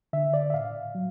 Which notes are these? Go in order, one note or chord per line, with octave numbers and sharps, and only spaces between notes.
D3 E5
D5
E5
A2 F5
F#3